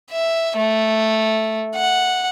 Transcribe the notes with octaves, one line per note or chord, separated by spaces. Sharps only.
E5
A3
F#5